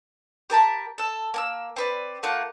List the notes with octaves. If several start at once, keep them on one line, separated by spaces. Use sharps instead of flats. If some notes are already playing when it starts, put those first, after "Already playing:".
G4 A#4 A5 B5
A4 E6
A#3 A5 E6
C4 B4 D5
A3 A#3 F4 F#5